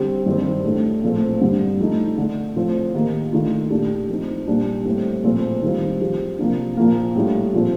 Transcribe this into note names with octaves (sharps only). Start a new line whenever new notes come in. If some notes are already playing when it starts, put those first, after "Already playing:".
Already playing: D3 G3 C4 G4
G2 D#3 G3 C4
A2 A3 D4
A#2 F3 A3 C4
G2 D3 G3
F3 A3 D#4
D3 A3 D4
A2 F3 C4 F4
D#3 A#3 D#4 G4
D#3 A3 D4 F4
A#2 A3 D4 G4
F3 C4 D#4
A#2 G3 D4
A2 G3 C4
A#2 F3 A3 C4 F4
D#3 G3 C4 F4
F3 C4 G4
C3 F3 A#3 D4
A#2 F3 A#3
A2 G3 D4 F4
A#2 F3 C4